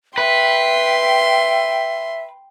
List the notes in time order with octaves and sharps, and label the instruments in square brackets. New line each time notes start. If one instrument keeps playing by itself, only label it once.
[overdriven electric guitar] B4 [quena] E5 [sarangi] G5 [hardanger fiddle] C6